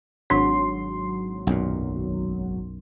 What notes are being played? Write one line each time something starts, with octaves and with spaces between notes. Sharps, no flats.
G#1 F#3 D4 C6
B1 F#2 A#2